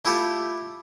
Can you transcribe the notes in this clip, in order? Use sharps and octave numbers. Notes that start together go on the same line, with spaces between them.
A3 E4 F4 G4 A4